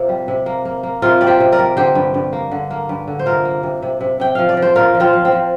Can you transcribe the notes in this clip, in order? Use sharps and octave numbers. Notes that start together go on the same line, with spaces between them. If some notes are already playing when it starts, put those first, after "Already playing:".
Already playing: C3 A#3 C4 F4
G3
C3
A#3
A#3
A#3
C3 F4 A#4
G3 D5
G4 C5
C3
A#4 D5
G3
D3 G4 C5
G2
G2
A#3
D3
A#3
G2
D3
C5
C3 F4 A#4
A#3
C3
C3
C3
C3 G5
F3 F5
D5
F3
C5
A#2 F4 A#4
F3
C4 F4
F3
C4
F3